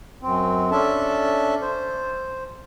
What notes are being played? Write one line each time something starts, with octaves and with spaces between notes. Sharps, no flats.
F#2 C4
C#4 D4 A4 E5 A5
C5